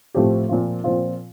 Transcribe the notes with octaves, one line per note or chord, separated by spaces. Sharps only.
A2 F3 A3 C4 G4
A#2 F3 C4 F4
A#2 F3 C4 F4